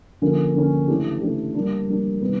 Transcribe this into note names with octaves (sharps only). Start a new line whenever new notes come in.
D3 F3 A#3 C#4
D3 F3 A#3 C#4
C#3 E3 A3 D4 G4
C#3 E3 A3 D4 G4
G3 A#3 D4
G3 A#3 D4
C3 D#3 G3 B3